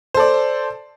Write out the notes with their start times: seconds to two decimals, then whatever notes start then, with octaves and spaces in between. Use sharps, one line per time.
0.14 C5
0.17 A4
0.20 D5